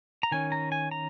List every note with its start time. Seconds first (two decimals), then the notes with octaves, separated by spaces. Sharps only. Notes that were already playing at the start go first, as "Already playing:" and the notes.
0.23 A#5
0.32 D#3 C#4 G#5
0.52 A#5
0.72 G#5
0.91 A#5